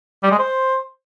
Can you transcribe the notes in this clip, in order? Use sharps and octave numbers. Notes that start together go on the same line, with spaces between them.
G3
G#3
C5